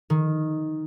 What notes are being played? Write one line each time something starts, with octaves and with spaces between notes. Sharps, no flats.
D#3